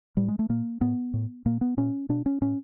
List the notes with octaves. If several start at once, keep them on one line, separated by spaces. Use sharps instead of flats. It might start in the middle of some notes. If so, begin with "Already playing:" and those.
A2 G3
G#3
A3
A#2 A#3
A2 B3
A2
A#2 A#3
B3
A#2 C#4
B2 D4
C#4
A2 C#4